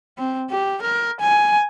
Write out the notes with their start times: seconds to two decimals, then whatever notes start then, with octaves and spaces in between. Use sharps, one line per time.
0.18 C4
0.50 G4
0.82 A#4
1.20 G#5